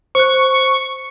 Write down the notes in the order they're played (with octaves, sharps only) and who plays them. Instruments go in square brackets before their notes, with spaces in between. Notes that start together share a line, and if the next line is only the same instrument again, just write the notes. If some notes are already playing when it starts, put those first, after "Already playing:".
[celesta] C5 F#6 [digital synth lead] C#6